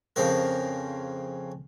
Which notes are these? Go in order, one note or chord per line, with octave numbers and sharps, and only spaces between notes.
F2 C#3 F3 A#4